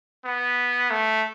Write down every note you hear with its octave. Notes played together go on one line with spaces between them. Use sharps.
B3
A3